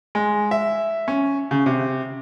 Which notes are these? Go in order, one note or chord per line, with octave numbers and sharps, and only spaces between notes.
G#3
E5
C#4
C#3
C3